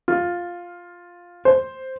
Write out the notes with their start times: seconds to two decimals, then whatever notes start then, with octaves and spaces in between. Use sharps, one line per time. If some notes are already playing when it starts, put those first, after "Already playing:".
0.08 F4
1.45 C5